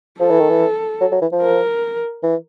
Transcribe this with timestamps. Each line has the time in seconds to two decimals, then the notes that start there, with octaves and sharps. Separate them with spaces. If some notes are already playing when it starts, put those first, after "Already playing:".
0.20 F3 A4
0.30 E3
0.40 D#3
0.50 E3
1.01 F#3
1.12 F#3
1.22 E3
1.32 F3
1.42 A#4
2.23 E3